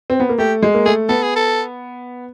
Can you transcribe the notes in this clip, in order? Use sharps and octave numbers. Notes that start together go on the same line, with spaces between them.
C4
B3
A#3
A3 G4
G#3
A#3
A3 G#4
B3 A4
G#4
A4